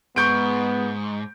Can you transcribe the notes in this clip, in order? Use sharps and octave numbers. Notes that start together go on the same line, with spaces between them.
G#2 B3 C#6 G6 D7